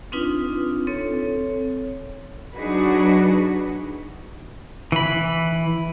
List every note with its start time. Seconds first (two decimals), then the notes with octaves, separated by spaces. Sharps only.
0.12 C4 D4 D#4 F4 B4
0.87 C4 A4 C#5
2.55 F#3 D4 D#4 F#4 G#4 B4
4.92 E3 B5